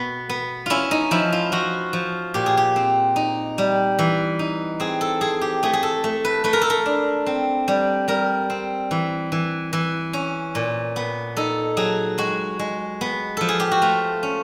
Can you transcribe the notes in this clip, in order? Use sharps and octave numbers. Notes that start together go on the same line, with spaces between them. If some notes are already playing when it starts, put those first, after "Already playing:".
Already playing: B2 B3
B3
C#4 E4 F4
D#4
F3 E4
F4
F3 F#4
F3
A#2 G4
G#4
G4
C4
D#4
G3
E3
D#4
C4 G#4
A4
C4 G#4
G4
A3 G#4
G#4
A4
A3
B4
A3 B4
A#4
A4
A#4
D4
C4
G3
G3 A#4
C4
E3
E3
E3
C#4
A#2
B3
D#4 A4
F#3 G#4
G#3 F#4
G#3
B3
F3 A4
G#4
G4
F#4
A3 F4
C#4